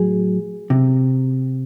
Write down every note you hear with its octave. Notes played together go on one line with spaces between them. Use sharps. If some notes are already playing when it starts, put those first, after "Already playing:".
Already playing: A2 F#3 G#4
C3